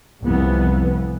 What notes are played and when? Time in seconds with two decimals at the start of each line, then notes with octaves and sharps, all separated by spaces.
0.23 C2 F2 E3 B3